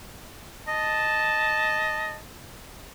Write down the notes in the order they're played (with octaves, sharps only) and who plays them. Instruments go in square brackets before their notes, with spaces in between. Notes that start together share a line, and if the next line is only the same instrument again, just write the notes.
[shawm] D#5 [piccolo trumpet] A5